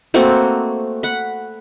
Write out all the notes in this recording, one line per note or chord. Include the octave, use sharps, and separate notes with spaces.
A3 A#3 C4 F#4
F#5 B5